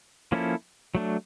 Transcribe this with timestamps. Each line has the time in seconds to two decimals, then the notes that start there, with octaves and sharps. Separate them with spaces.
0.32 F3 A#3 C#4 E4 A4
0.95 F#3 A3 D4